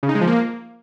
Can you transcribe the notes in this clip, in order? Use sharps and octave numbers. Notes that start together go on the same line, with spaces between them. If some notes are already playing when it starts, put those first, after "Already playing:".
C#3
D#4
G#3
F3
A#3